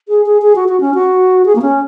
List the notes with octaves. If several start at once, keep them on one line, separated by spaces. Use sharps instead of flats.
G#4
G#4
G#4
F#4
F#4
C#4
F#4
G#4
A#3
C#4